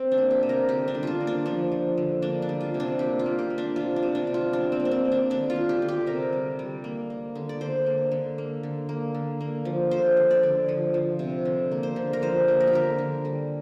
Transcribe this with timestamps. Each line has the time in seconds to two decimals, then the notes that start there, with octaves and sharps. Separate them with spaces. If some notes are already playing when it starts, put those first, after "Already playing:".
Already playing: C4
0.12 D4
0.18 A#3
0.31 G4
0.43 C3
0.49 A#4
0.69 D3 G4
0.88 D4
0.95 G3
1.03 D4 F4
1.21 A#3
1.27 D4
1.46 F3 D4
1.72 F3
1.98 D3
2.22 A#3 D4
2.42 D4
2.49 G3
2.61 F4
2.74 C3
2.80 D4
2.99 A#3 G4
3.19 F4
3.26 A#3
3.39 G4
3.50 A#3
3.58 D4
3.76 C3 F4
3.96 D4
4.03 C3
4.15 D4
4.27 C3
4.34 F4
4.53 G3 D4
4.72 C4
4.80 A#3
4.85 D4
4.91 C4
5.05 A#3
5.12 D4
5.30 D3 D4
5.50 F4
5.56 D3
5.69 G4
5.82 D3
5.89 G4
6.07 C3 A#4
6.33 G3
6.59 G3
6.84 A#3
7.10 A#3
7.35 D3
7.49 D5
7.61 D3 C5
7.86 A#3
8.12 D3
8.38 A#3
8.63 D3
8.89 A#3
9.15 D3
9.41 A#3
9.65 F3
9.91 D3 C5
10.17 D3
10.31 D5
10.43 D3
10.68 F3
10.94 F3
11.19 C3
11.45 D3
11.72 A#3
11.83 C5
11.96 D3
12.13 A#4
12.22 F3 C5
12.48 A#3
12.60 A#4
12.67 G4
12.73 D3 A#4
12.98 D3
13.25 G3